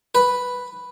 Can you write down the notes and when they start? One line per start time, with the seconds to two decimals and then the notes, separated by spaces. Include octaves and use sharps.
0.15 B4